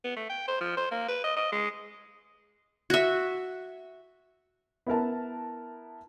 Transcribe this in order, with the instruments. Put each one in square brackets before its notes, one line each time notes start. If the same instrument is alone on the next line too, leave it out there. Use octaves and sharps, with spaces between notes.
[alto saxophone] B3
A3
G5
C5
F3
C5
A#3
B4
D#5
D#5
G#3
[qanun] F#4 E5
[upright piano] B3 E4 A#4 A5